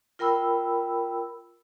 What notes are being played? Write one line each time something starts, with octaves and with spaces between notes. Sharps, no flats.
F4 A#4 G5 B5 E6